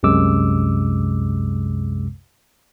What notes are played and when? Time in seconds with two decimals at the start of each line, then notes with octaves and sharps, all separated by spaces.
0.03 C2 F#2 C3 G#3 D6 E6